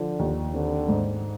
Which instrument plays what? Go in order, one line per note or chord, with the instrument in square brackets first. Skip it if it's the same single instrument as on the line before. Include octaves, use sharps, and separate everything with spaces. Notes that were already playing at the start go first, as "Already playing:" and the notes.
Already playing: [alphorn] D3 [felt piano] F3
[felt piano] D#2
[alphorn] D3 [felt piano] C4
[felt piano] G#2